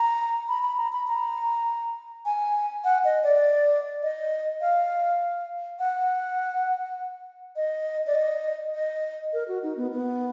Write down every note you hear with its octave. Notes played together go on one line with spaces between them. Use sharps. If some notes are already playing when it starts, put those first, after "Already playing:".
Already playing: A#5
B5
B5
A#5
B5
A#5
G#5
F#5
D#5
D5
D#5
F5
F#5
D#5
D5
D#5
D#5
A#4
F#4
D#4
B3
B3